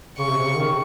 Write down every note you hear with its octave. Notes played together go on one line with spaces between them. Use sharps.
C#3 C#6
C3
C3
C#3
D#3